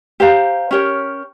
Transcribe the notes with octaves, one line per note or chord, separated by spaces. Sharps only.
G4 C5 F5 A#5
C#4 G4 A#4 C#5